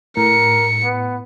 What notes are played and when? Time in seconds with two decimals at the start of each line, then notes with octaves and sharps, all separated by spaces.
0.17 A2 A#4 C#7
0.83 B3